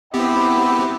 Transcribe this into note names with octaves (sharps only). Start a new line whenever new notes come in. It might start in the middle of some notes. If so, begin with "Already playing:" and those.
B3 C4 E4 G4 F#5 B5 D6